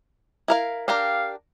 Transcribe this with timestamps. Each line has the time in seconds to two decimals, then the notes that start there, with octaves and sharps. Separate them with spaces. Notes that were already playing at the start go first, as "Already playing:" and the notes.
0.48 E4 A#4 F5
0.88 D4 G4 A#4 F5